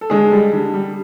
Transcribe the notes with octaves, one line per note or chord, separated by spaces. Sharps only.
A4
D3 G#3 G#4
G3
D3
G3